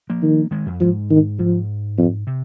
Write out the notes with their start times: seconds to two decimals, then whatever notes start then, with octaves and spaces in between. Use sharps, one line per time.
0.10 F3 A#3
0.22 D#3
0.51 D#3 G#3
0.66 F2
0.80 G#2 F3
1.10 D#3
1.39 G#2 F3
1.98 F2
2.27 C3